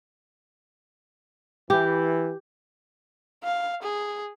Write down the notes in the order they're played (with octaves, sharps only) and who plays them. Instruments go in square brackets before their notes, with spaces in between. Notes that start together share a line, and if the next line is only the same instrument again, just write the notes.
[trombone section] E3 [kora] G4
[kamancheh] F5
G#4